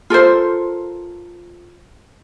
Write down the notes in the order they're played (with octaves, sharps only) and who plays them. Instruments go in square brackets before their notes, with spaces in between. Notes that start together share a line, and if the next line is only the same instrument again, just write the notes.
[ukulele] F4 A4 A#4 C5